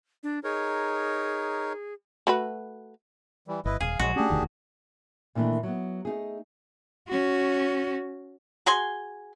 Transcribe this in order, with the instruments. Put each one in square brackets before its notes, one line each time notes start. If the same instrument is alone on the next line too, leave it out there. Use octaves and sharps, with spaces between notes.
[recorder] D4
[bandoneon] D#4 A#4 C#5 [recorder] G#4
[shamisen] A3 F#4 B4
[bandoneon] E3 G3
[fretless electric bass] G1 [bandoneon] E4 B4 D#5
[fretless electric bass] D#1 [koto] G#4 [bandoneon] F5
[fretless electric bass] A#1 [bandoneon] F#3 G#3 [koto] F#4
[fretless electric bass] A3 C#4 [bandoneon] D4 G4 G#4
[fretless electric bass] E1 D2 D#3
[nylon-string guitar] A#2 D#3 E3 A3 D4
F#3 B3
A3 D#4 G#4
[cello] C#4 F#4
[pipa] F#4 G#4 G#5 C6